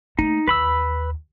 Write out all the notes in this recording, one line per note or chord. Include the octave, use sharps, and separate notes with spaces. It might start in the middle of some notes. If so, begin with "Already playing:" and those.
A3 A#3 D#4
D#2 B4 B5 E6